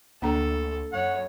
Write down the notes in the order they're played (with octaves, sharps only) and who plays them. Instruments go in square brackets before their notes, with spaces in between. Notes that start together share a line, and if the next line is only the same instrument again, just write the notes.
[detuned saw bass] D2 [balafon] A#3 D4 A#5 [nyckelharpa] A4
[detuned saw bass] F#2 [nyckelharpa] C#5 [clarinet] F#5